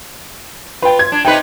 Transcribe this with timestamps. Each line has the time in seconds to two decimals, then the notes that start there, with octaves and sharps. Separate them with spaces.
0.82 F4 B4 G5
0.99 G#6
1.12 D4
1.25 C3 D#4 B4 G5